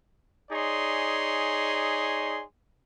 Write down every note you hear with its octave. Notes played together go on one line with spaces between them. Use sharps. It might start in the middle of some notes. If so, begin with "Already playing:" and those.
D#4 G#4 C#5 D5 G#5 C6